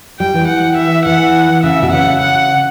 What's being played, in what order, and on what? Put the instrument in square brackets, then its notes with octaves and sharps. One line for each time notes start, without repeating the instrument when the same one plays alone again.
[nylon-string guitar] G3 [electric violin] G5
[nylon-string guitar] E3
[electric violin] F#5
E5
[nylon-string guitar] E3 [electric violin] F#5
[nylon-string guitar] C#3 [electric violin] E5
[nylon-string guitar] B2
[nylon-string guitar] C#3 [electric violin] F#5
[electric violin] F#5